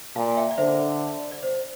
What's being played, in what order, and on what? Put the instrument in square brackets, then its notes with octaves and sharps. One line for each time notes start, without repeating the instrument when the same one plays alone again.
[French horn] A#2 [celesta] F5 A5
[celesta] E5 G5
D5
[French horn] D3 [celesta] C5 E5
[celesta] D5
C5